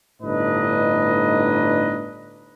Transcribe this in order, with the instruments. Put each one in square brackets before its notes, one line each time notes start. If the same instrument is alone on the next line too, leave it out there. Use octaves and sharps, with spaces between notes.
[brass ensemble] G1 A2 D4 D#4 B4 D#5